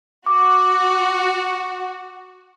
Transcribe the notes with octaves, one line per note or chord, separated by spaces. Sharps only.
F#4 D6